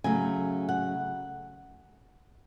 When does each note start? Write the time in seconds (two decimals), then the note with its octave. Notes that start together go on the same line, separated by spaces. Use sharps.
0.04 C#3 F#3 A3 G#5
0.69 F#5